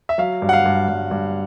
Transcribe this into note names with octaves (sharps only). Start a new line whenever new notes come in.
E5
F#3 F5
G2
F#5
F5
G2
G2
G2